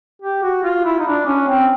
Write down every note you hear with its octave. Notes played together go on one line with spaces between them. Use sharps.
G4
F#4
F4
E4
D#4
D4
C#4
C4